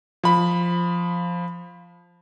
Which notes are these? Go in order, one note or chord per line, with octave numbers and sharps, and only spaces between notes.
F3 B5